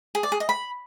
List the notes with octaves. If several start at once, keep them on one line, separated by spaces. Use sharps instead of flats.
G#4
D5
G#4
D#5
B5